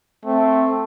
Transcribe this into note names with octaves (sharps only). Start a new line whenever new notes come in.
A3 C4